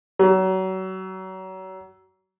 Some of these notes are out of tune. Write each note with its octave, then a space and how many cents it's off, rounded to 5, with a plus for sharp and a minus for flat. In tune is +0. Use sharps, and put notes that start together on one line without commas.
F#3 +30